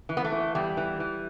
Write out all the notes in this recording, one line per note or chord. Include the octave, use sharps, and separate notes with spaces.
E3
B3
A3
E3
E2 G3
E3
E3